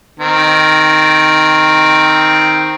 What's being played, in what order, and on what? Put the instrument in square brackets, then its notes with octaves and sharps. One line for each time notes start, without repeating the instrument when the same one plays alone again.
[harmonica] D#3 C4